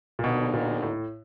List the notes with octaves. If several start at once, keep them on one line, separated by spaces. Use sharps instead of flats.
A#2
D#2 B2 D3 F#3 B3 D#4
A#2
A2